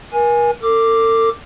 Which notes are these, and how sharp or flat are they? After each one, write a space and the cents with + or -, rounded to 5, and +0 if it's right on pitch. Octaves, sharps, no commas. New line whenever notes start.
A#4 +40 G#5 +0
A4 +45 D6 +0